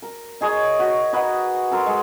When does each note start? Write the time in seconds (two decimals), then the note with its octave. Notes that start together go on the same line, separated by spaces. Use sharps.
0.02 A#4
0.41 D#4 G#4 C#5 D#5
0.79 F#4
1.13 D#4 B4 F#5
1.71 A4 A#4 C6
1.86 G#3